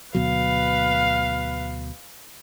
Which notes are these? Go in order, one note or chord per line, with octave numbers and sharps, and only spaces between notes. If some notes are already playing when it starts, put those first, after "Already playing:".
D2 B2 F#3 B4 F5